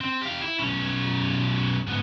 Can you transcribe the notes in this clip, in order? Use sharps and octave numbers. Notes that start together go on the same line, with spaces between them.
C4
G4 F5
E4
B1 C#4
G#2 B3